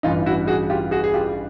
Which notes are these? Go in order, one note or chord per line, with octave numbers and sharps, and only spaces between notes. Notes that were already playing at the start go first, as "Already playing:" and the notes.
A1 G2 E3 D#4 F4
E4 F#4
F#4 G#4
F4 G4
F#4 G#4
G#4
F4 G4